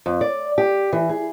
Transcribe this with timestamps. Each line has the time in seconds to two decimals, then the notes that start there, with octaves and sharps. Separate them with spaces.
0.06 F2
0.21 D5
0.58 G4
0.93 E3
1.09 G#4